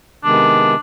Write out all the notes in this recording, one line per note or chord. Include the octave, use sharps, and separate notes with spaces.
C3 D#3 G#3 B3 D4